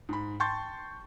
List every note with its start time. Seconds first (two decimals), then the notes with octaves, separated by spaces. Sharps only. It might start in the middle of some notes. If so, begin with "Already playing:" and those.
0.09 G#2 B5
0.40 G5 A5 C6 C#6 G6 A6